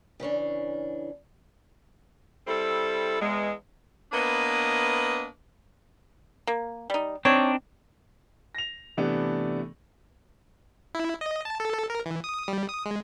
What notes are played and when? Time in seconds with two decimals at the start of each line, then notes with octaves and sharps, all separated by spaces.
0.20 C#3 E3 C#4 D4
2.47 G3 C4 E4 A4
3.21 E2 G#3
4.12 A#3 B3 D4 B4 C#5 D#5
6.47 A#3
6.90 G3 D#4
7.25 C4 D4 D#4 C#5
8.55 A#6 F7
8.97 C3 E3 A3 B3 D4
10.95 E4
11.21 D#5
11.45 A5
11.60 A4
11.74 A4
11.90 A#4
12.06 E3
12.24 D#6
12.48 G3
12.69 D#6
12.86 G#3